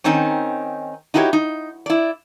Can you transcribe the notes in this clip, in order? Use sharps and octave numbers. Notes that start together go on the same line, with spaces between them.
D#3 C4 C#4 D#4
D#4 E4 F#4 G4 A4 C#5
D#4
E4 D5